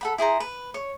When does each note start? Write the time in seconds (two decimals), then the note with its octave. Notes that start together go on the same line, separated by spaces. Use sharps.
0.01 A4 F#5 B5
0.18 E4 G#4 C5 A#5
0.40 B4
0.74 C#5